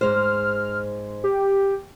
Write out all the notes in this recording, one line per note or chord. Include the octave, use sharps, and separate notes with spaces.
G#2 G#3 C5 F6
G4